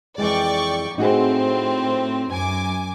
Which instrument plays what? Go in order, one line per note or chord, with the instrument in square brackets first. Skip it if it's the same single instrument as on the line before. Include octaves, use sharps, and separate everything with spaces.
[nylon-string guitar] F2 E3 G#3 [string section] D5 G5 C#6
[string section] A2 C4 [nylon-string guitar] D#4 F#4 G#4
[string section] F#2 G#5 D6